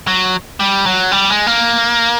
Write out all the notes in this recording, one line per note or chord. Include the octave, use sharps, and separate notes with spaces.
F#3
G3
F#3
G3
G#3
A#3